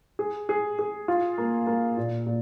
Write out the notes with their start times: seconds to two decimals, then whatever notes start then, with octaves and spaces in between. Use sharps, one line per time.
0.19 G#4
0.49 G#4
0.79 G#4
1.08 F4
1.38 A#3
1.67 A#3
1.97 A#2
2.26 A#2